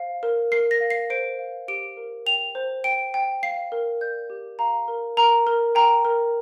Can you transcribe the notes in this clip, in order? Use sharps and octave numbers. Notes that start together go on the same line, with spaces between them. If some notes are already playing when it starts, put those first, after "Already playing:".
Already playing: C5 F5
A#4
A#4 C7
A#6
F5
C7
C5 D7
F5
G4 D7
A#4
G5 F7
C5
G5 D7
G5
F5 C7
A#4
D5 G6
G4
F5 A#5
A#4
A#4 A#5
A#4
G5 A#5
A#4